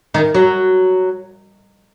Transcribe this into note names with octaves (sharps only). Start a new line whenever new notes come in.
D#3
F#3